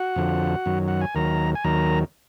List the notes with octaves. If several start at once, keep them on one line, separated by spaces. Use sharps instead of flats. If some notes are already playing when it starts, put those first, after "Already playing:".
Already playing: F#4 F#5
F2 D3 F3
F#2 D#3 F#3
F#5
G#5
D#2 D#3 F#3 A#4 A#5
G#5
D#2 D#3 F#3 A#4 A#5